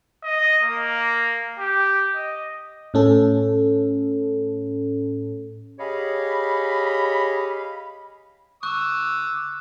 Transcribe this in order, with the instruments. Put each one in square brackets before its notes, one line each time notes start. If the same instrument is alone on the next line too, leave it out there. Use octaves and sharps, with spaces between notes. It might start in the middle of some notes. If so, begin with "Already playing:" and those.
[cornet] D#5
A#3
G4
D#5
[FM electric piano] A2 C#4 A4
[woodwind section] G4 G#4 C#5 D#5 F5 B5
[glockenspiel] C#6 F#6 [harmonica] D6 E6